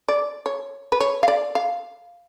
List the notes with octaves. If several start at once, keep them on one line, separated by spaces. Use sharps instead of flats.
D5
C#5
B4
C#5
F5
D5
F5